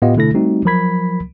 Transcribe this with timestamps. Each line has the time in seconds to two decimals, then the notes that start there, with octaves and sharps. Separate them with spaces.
0.02 A2 B3 F4 G4 D#5 F5
0.16 B2 D3 A3 E4 A4 A#6
0.34 G3 A3 C4 D#4 F#4
0.65 F3 F#3 A#4 B5 G#6 B6